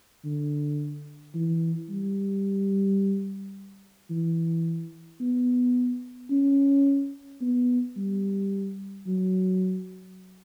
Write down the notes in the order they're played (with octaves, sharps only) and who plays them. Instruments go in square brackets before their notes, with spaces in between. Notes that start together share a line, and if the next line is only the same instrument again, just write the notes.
[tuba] D3
E3
G3
E3
B3
C#4
B3
G3
F#3